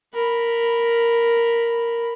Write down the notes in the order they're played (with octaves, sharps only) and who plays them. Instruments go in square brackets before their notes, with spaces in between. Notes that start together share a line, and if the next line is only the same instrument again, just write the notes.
[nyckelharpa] A#4 B5